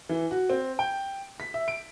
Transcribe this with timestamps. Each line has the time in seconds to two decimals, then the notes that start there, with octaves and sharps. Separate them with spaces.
0.09 E3
0.31 F#4
0.50 C4
0.79 G5
1.40 B6
1.54 E5
1.68 D7